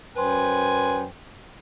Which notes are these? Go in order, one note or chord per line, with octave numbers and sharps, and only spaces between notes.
F#2 B4 C5 G5 G#5